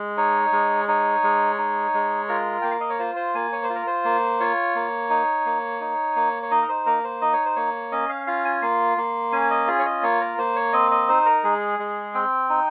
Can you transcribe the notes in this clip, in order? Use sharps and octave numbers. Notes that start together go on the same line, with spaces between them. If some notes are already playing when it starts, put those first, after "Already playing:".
Already playing: G#3
D#4 C#5
G#3
D#4 C#5
G#3
D#4
G#3
F4 A#4
A#3 G5
F5
D#5
C#5
F4 C5
C5
A#3 G#5
C#5
C5
F4
A#4
C5
A#3
F4 C#5
A#3
D#4
A#3
D#4
A#3
C#5
D#4 D#5
A#4
C5
A#3 A#4
C5
D#4 D#5
C#5
C5
A#3 C#5
C#4 D#5
F5
F4 F5
G#5
A#3 C6
A#3
C#4 G#5
D#5
F4 G#4
C#5
D#5
A#3 C#5
A#4
A#3 C5
C#5
C4 D#5
D#5
D#4 C5
A#4
G#3 G#4
G#3
C4 G5
D#4